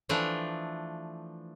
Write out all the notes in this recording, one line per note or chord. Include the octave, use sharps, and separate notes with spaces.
E3 F3 A3 D4